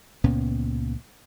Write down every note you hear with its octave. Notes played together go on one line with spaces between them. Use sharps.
C#2 A#2 B3 C#4